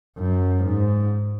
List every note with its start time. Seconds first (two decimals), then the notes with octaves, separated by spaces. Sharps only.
0.18 F#2
0.65 G#2